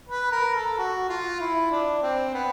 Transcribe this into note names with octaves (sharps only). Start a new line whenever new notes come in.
B4
A#4
A4
F#4
F4
E4
D4
C4
B3